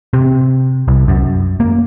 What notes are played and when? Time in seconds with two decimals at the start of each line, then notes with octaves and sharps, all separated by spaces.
0.13 C3
0.88 C2
1.08 F#2
1.60 A#3